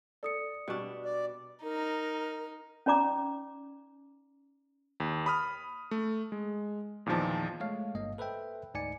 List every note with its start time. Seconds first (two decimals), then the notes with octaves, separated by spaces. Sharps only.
0.23 A4 D5 D#6 C#7
0.68 B2 G3 D4 C#6
1.05 D5
1.63 D#4 A#4
2.86 C#4 D#4 D5 A#5 D6
5.00 D#2
5.26 B5 D#6 F6
5.91 A3
6.32 G#3
7.06 E2 A#2 D#3 F3 A5
7.60 G#3 A3 C#5 F5
7.94 G1 G2 A#3 D#5
8.18 A4 B4 C5 E5 G5
8.74 D2 G#2 D#4 D5 G#5 C#7